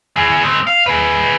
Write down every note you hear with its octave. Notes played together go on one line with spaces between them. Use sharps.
E3 G#4
G#3 C4
F5
G#4 B4